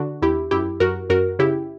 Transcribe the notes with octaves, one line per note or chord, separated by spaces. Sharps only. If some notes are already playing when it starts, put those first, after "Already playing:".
Already playing: D3 D4 F#4
E2 E4 G4
F#2 E4 G4
F#2 F#4 A#4
F#2 F#4 A#4
C#3 E4 G4